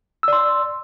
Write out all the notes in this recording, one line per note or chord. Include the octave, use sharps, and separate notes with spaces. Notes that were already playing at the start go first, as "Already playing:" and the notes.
D5 C6 E6